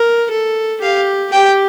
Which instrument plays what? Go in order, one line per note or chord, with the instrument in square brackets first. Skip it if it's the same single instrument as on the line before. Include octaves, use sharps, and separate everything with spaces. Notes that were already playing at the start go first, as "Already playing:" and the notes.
Already playing: [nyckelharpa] A#4
A4
[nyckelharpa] G4 [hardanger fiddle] F5
[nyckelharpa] G4 [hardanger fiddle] G5